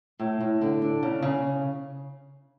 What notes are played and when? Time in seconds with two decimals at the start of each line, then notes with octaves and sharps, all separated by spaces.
0.20 A2
0.40 A2
0.61 D3
0.82 D4
1.03 C#3
1.22 C#3